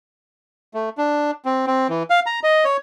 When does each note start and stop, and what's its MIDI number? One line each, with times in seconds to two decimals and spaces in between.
0.74 0.89 57
0.98 1.31 62
1.45 1.66 60
1.67 1.87 60
1.89 2.03 52
2.10 2.20 77
2.26 2.40 82
2.43 2.64 75
2.65 2.77 73